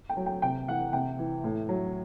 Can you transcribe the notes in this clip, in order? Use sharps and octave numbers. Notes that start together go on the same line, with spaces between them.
G5
F#3
G5
C3 G5
E3 F#5
C3 G5
E3
A2
F#3